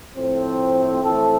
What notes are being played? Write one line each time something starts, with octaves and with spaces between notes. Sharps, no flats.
A2 F3 A3 C4
A2 E3 A3 C4 A4